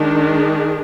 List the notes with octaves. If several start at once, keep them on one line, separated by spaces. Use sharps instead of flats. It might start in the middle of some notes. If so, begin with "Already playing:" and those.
Already playing: D#3 G#3 D4
G#4